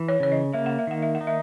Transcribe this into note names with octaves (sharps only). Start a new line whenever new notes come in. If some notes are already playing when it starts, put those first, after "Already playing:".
Already playing: E3
C#5
C#3 C#5
D#5
A#3 E5
F#5
E5
D#3 F#5
E5
F#5
D#4
E5